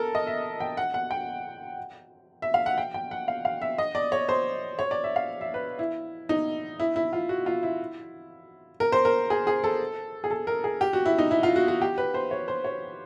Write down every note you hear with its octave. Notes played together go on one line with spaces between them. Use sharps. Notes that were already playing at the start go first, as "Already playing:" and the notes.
Already playing: A4 A#4
D#5
E5
G5
F#5
F#5
G5
E5
F5
F#5
G5
G5
F#5
F5
F5
E5
D#5
D5
C#5
C5
C#5
D5
E5
F5
E5
B4
E4
D#4
E4
E4
F4
F#4
F4
E4
A#4
C5
A#4
G#4
G#4
A4
G#4
A4
A#4
G#4
G4
F#4
E4
D#4
E4
F4
F#4
F#4
G4
B4
C5
C#5
C5
C#5